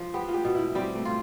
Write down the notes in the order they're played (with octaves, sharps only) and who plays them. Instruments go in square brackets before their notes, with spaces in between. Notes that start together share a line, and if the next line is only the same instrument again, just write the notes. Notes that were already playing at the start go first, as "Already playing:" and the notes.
Already playing: [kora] F3
[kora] B3 [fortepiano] G4
[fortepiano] F4
G4
[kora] B2
[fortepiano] E4
[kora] G3 [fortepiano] C4
[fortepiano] A3
[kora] F4